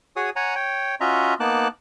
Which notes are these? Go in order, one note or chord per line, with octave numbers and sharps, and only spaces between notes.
F#4 G#4 C#5 G#5 D#6
C#5 F#5 G#5 A#5
C#5 G5
C#4 F4 F#4 D#5 E5 A#5
A#3 B3 D#4 A5 D6 F#6